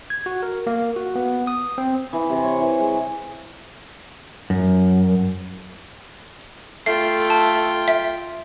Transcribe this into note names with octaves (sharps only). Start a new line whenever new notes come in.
G#6
F#4
A#4
A#3
F#4
B3
D#6
C4
E3
C3
C#5
E3
G#3
F#2
A3 F4 G5 C7
A5
E5